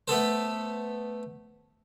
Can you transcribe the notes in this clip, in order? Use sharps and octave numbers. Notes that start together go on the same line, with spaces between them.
A3 B3 A4 C5